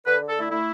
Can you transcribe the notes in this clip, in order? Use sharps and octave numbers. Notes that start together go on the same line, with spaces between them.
D3 B4
D3
A4
A3 E4
A3 E4